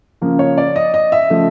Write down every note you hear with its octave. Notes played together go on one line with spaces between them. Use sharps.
C#3 F3 A#3
C#5
D5
D#5
D#5
E5
C#3 F3 A3